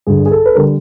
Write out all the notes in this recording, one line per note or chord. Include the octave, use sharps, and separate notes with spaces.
G2 D3 G3 G#4
G#4
A4
B4
D3 G3 A#4